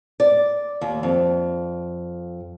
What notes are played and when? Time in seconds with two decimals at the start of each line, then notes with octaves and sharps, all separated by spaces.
0.20 D5
0.81 D#2
1.03 F2